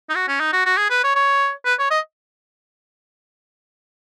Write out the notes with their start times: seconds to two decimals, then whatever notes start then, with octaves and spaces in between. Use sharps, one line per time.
0.09 D#4
0.15 F#4
0.28 C#4
0.40 D#4
0.53 F#4
0.66 F#4
0.77 G#4
0.90 B4
1.03 C#5
1.15 C#5
1.65 B4
1.79 C#5
1.90 D#5